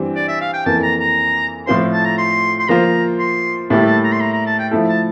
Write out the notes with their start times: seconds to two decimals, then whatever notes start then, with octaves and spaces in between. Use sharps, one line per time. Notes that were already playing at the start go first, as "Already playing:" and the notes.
Already playing: G2 E3 G3 C4 G4
0.15 D5
0.28 E5
0.41 F5
0.53 G5
0.66 F2 E3 A#3 A5
0.83 A#5
1.00 A#5
1.67 A2 F3 C4 F4 C5 C6
1.93 A5
2.05 A#5
2.18 C6
2.59 C6
2.69 F3 A#3 F4 C5 A#5
3.19 C6
3.70 A2 G3 A#3 E4 G4 A5
3.86 A5
4.04 A#5
4.13 C6
4.21 A#5
4.33 A#5
4.46 A5
4.59 G5
4.71 F3 A3 E4 A4
4.89 A5